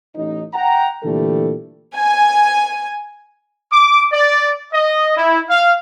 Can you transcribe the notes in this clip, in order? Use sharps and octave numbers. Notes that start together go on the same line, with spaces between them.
A1 D#4
F#5 G5 A#5
A#2 D3 E3 G3 A3 A4
G#5
D6
D5
D#5
E4
F5